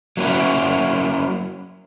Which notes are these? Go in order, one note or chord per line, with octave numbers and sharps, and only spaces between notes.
F#3 A#3 C#4 E4